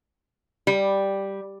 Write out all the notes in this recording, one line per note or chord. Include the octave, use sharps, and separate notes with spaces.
G3